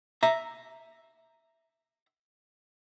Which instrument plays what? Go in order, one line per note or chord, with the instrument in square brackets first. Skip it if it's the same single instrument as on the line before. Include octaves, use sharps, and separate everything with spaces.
[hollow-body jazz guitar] E5 A#5